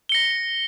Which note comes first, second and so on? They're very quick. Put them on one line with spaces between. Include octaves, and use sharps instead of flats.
G7 C#7 A#6